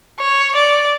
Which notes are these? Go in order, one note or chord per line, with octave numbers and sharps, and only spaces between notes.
C#5
D5